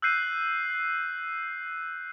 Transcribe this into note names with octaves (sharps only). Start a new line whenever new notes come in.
E6 F#6 G6 C7 D#7